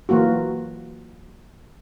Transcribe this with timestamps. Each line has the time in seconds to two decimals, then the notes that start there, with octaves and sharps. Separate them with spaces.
0.09 E3 F#3 A#3 F4 F#4